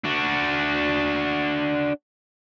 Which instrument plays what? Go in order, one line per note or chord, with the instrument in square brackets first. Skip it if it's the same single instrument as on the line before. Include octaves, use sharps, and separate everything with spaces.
[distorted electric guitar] D4 F#4